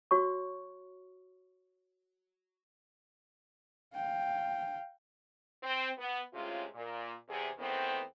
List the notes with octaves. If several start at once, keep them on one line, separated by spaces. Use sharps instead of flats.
F#4 C#5 C#6
F5 G5
C4
B3
A2 C3 G#3 C#4 F4
A#2
E2 C3 G#4
E2 D#3 A3 B3 C4